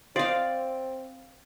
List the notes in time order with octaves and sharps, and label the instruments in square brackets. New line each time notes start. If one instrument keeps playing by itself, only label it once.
[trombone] C4 [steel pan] F4 C5 D#5 [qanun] D5 F5